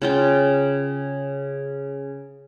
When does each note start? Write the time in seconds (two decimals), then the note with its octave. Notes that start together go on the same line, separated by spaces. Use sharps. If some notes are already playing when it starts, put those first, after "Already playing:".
0.02 C#3 F4 G5